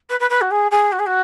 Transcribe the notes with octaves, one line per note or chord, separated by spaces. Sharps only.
B4
B4
B4
F#4
G#4
G#4
F#4
G#4
F#4